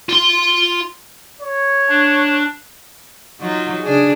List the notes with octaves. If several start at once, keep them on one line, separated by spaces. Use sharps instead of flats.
F4 C6
C#5
D4
F#3 D#4 F4
C#3 D4 G#4